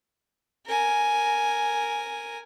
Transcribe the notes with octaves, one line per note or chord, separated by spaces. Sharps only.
A#4 G#5